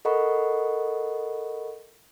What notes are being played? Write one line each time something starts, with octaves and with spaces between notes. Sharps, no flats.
A4 A#4 D#5 F#5 B5 C#6